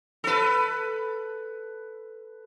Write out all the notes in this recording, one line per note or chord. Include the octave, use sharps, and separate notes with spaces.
A4 B4